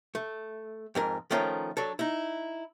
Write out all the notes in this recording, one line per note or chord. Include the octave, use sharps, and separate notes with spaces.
A3
F2 G#2 A#4
D#3 F3 A3 C#4 F4 A#4
F#3 D4 A4
D#4 E4